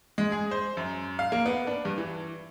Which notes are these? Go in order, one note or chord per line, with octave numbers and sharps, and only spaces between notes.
G#3
G#4
C5
F#2
F5
A#3
B3
D4
G2
E3